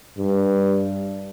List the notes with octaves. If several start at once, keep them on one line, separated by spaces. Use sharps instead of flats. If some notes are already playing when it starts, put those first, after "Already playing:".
G2